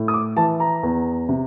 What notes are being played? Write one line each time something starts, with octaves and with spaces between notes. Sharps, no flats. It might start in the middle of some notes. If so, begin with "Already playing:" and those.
Already playing: A2
D#6
D6
E3 A5
A#5
E2
C3